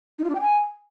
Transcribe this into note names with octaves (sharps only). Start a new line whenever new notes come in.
D#4
F4
D4
G5
G#5